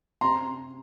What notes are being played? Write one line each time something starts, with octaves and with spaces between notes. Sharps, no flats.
C3 A#5 C6